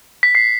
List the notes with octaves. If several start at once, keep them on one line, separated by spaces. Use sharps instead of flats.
B6
C7